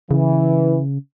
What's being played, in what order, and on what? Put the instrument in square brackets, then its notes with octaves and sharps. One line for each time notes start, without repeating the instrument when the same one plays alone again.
[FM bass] C#3 [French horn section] E3